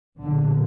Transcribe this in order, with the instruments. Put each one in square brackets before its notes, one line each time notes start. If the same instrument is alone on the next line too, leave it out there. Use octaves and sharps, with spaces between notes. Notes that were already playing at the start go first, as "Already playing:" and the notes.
[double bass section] B1 A#2 D3